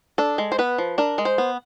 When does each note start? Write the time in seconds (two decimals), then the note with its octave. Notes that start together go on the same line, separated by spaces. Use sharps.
0.18 D4 A4
0.38 G#3
0.52 C5
0.58 B3 B4
0.78 F3
0.98 D4 A#4
1.18 G#3
1.25 C5
1.38 B3